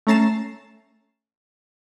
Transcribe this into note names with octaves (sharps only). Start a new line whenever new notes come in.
A3 C#4 A#5 A6 C7 E7